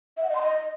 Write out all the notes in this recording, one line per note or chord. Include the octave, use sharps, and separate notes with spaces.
E5
F#5
D#5
C6
D#5